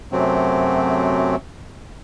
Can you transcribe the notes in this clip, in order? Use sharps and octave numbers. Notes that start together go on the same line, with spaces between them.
F#2 C3 F#3 A3 C4